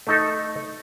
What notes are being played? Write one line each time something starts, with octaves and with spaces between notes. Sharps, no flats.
A3 D#4 A4